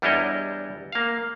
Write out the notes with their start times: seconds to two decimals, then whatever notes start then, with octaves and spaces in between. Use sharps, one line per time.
0.02 E2 G3 D4 E4 C#5 D#5
0.92 A#3 F5